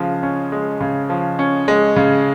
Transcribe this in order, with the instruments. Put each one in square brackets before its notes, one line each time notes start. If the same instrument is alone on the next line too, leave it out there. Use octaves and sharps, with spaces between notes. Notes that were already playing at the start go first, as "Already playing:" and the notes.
Already playing: [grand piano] C#3 F3 G#3
C#4
G#3
C#3
F3
C#4
G#3
C#3